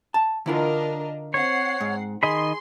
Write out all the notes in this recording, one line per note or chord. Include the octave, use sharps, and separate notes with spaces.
A5
D3 D4 E4 F4 A#4 D#5
C4 C#5 F#5 C7
G#2
D#3 G#4 D#5 B5 C6